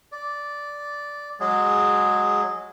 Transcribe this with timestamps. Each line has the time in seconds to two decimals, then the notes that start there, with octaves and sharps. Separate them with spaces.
0.12 D5
1.40 F#3 G#3 G#4